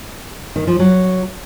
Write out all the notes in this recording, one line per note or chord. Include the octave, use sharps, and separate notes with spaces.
D#3
F3
F#3